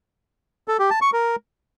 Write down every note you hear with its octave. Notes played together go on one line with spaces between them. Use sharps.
A4
G4
A5
C#6
A#4